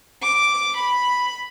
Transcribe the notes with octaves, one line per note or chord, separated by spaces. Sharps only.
D6
B5